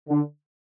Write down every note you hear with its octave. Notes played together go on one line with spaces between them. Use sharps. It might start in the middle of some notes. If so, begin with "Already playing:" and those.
D3